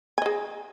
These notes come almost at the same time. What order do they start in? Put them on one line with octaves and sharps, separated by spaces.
G#5 D#5 G#4